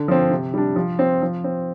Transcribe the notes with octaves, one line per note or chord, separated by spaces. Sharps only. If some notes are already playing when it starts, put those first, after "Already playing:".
Already playing: D3
F3 C4
C3
G3 D4
F3
C4
F3
C4